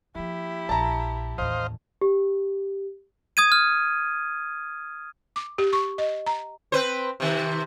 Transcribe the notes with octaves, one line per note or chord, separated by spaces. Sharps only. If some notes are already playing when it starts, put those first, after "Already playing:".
F3 A#3 E4 G4
A#1 F3 A5 A#5
A1 D#2 C5 D#5 F5
G4
D#6 G#6 D#7
F6
D6
G4
C#6
D#5
A#5
C4 B4 C5
C3 D#3